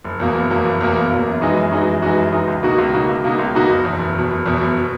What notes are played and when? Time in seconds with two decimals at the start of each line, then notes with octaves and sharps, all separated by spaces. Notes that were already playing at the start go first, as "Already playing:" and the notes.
0.04 F#1
0.20 E2 B2 A#3
0.35 F#1
0.50 E2 B2 A#3
0.65 F#1
0.81 E2 B2 A#3
0.96 F#1
1.11 E2 B2 A#3
1.26 F#2
1.41 E3 G#3 D#4 F#4
1.57 F#2
1.71 E3 G#3 D#4 F#4
1.87 F#2
2.02 E3 G#3 D#4 F#4
2.17 F#2
2.32 E3 G#3 D#4 F#4
2.48 C#2
2.63 B2 A#3 D#4 F#4
2.78 C#2
2.93 B2 A#3 D#4 F#4
3.09 C#2
3.24 B2 A#3 D#4 F#4
3.39 C#2
3.54 B2 A#3 D#4 F#4
3.70 F#1
3.85 E2 B2
3.99 F#1
4.15 E2 B2
4.31 F#1
4.46 E2 B2
4.61 F#1
4.77 B2